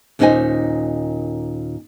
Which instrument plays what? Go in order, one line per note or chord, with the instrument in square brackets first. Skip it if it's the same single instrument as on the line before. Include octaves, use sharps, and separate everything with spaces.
[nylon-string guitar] D#2 A#2 C#4 D#4 C5 G#5